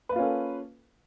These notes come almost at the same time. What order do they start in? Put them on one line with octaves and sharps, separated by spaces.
B4 A#3 F4 C#4 A4